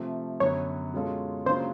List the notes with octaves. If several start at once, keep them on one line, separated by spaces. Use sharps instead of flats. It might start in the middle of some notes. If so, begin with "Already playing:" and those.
Already playing: C3 F3 A3
F#2 D3 F#3 B3 C#5
B2 G#3 C#4 F4 A4
C#3 F#3 A#3 D4 F4 C5